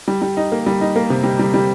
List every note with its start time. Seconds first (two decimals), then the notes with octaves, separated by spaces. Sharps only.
0.08 G3
0.22 G3
0.37 D#4
0.52 A#3
0.66 G3
0.81 D#4
0.96 A#3
1.10 C3
1.24 G3
1.39 G3
1.54 G3